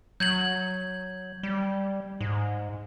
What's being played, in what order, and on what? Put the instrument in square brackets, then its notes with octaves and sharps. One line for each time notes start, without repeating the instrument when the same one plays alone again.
[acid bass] F#3 [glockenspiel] G6 G#6 F#7
[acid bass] G3
G#2